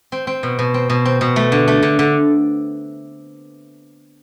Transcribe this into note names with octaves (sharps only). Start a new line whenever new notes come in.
C4
C4
B2
B2
C4
B2
C4
B2
A3
D3
A3
D3
D3